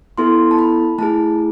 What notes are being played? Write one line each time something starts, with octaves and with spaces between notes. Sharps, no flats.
B3 E4 A4 C6
A5
B5
A3 E4 G#4 A5